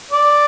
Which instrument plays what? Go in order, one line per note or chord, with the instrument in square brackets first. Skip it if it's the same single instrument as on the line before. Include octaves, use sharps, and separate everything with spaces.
[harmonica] D5